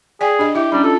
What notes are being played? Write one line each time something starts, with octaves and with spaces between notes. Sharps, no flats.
G#4 D5 G5 G#5
D4 G4 D#5
E4 G4 E5
G3 C#4 D4
F4 A4